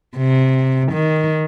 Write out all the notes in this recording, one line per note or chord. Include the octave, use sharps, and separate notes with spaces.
C3
D#3